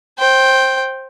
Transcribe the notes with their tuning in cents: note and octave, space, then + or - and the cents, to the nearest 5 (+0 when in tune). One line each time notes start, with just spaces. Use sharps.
C5 +20 G5 +0